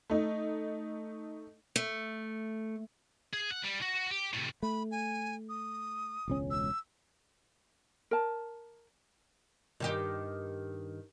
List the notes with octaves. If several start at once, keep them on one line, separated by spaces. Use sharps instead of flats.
A3 D#4
A3
G#4
F#5
G3
F#4
G4
A2 C3
A3 B5
G#5
D#6
E1 C#2 C#4
E6
A#4 A5
G2 D#3 G4